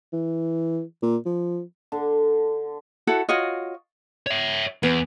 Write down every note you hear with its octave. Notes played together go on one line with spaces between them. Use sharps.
E3
A#2
F3
D3
E4 F#4 A4 F#5
F4 F#4 C#5 D#5
C#5 E5
E2 B3